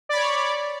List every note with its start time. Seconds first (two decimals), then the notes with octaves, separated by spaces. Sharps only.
0.09 D5
0.13 B5
0.16 C#5